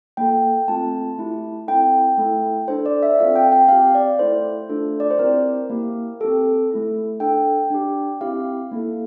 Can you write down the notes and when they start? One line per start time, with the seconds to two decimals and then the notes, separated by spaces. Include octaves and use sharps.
0.17 A#3 F4 A4 G5
0.68 A3 C4 F4 A4 A5
1.18 A3 E4 G4
1.67 C4 E4 A4 G5
2.18 A3 E4 A4
2.68 D4 A4 C5
2.86 D5
3.03 E5
3.19 C4 F4 A4 F5
3.35 G5
3.52 G5
3.68 C4 G4 F5
3.95 D5
4.19 A3 E4 A4 C5
4.69 A3 D4 F4 A4
5.00 D5
5.10 C5
5.19 C4 E4 G4 A#4
5.70 A#3 E4 G4
6.20 C4 G4 A4
6.71 A3 E4 A4
7.20 D4 A4 G5
7.70 D4 G4
8.21 C4 E4 G4 F5
8.71 A#3 E4 A4